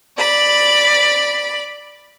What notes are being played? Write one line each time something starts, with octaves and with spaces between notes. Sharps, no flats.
D5 B5